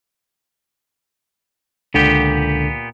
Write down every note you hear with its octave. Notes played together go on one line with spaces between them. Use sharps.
C#2 A#2 D3 B3 G4